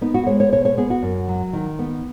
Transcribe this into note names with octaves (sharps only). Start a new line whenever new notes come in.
B3 D#4
F#4
G#3 C#5
C#5
B2 C#5
C#5
B3 G#4
F#4
F#2
F#3
D#3
B3